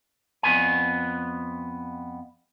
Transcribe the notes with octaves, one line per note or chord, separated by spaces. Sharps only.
F2 B3 G#5